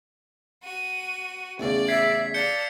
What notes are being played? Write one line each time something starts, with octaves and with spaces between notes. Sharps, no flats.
F#4 D#7
A1 E2 C#3 D5
E5 G#6 B6 C7
A4 D5 F5 G6 C#7 G7